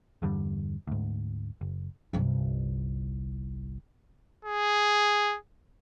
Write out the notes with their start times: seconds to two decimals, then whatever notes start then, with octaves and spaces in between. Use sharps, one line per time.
0.22 E2 G2 D3 G3
0.87 D2 G#2
1.61 F#1
2.13 G1 C2
4.45 G#4